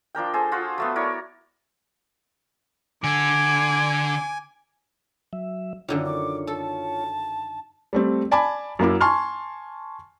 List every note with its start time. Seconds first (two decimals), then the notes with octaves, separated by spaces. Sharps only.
0.15 F3 D4 A#4 G5
0.33 G#4 A4 C5
0.52 F4 F#4 C5
0.78 F#3 A3 B3
0.96 E4 A#4 C#5 D5
3.04 D3 G#5 D6 G#6
5.33 F#3 E5
5.88 F#2 D3 D#3 F4 C#5
6.06 D6
6.47 A4 A5
7.93 G3 A3 C4
8.31 D5 G#5 A5 B5 D6
8.79 F#2 A#3 E4 D6
9.01 G#5 A5 C6 C#6 F6